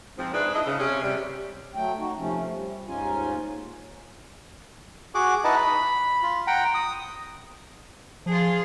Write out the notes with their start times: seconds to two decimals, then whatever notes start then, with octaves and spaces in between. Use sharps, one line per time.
0.18 G#2 F3 C4
0.33 G#2 D4 E4 G#4 B4
0.54 D4 E4 D#5
0.66 C#3
0.79 C3 C#4
1.01 C3 G3
1.75 F#3 A3 G5
1.99 D#4 F#4
2.18 C3 F3 A3 C#4
2.54 G3
2.87 D#2 G#2 C#4 D#4 F4 G#5
5.15 F#4 G#4 F#5 D6
5.44 D#4 E4 B4 D#5 F#5 A5
5.56 B5
6.23 F4
6.47 F#5 G5 A#5
6.74 D#6
8.26 F3 F4 G#4